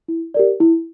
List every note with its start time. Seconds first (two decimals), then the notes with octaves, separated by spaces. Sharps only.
0.08 E4
0.34 G4 A#4 D5
0.60 E4